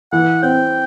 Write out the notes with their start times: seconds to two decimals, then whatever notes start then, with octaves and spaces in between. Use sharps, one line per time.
0.12 E3 F#5
0.43 C4 G5